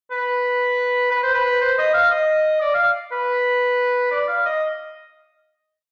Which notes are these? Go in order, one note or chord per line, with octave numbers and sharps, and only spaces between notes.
B4
B4
C5
B4
C5
D#5
F5
D#5
D5
F5
B4
D5
F5
D#5